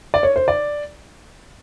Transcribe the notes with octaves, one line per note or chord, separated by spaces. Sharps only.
D5
C#5
C5
D5